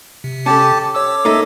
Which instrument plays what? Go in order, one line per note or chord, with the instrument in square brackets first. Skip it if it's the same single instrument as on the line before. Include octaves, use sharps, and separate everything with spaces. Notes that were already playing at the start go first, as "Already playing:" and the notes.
[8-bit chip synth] C3
[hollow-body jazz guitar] C#4 A4 [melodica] G4 A5
[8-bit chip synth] C#5 D6 [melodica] E6
[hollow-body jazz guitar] A#3 D#4 A4 [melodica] E5